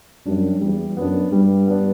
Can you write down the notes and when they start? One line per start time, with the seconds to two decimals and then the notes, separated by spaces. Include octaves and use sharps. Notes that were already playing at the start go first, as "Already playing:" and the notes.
0.26 F#2 G3 D4
0.61 E2 G3
0.97 F#2 B3 D4
1.32 G2 G3
1.68 B3 D4